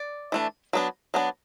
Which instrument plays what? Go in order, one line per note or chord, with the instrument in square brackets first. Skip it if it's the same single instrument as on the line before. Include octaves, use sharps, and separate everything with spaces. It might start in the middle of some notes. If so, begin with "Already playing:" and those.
Already playing: [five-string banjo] D5
E3 A3 D4
F#3 B3 D4
F#3 B3 D4